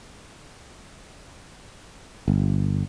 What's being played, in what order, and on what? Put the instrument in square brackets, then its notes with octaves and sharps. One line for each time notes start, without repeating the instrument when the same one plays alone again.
[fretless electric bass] G1